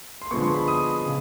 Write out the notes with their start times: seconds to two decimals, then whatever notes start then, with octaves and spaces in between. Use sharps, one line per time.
0.22 C6
0.31 D3 F3 G#3 B3 C#6
0.43 C6
0.55 B5
0.68 D#6
1.05 C#3